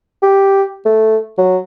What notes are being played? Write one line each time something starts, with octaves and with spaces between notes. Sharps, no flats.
G4
A3
F#3